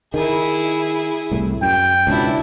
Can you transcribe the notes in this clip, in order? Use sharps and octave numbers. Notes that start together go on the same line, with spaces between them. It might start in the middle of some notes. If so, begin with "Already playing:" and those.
D#3 E4 G#4
C2 A2
F#2 G5
C#2 B2 D4 E4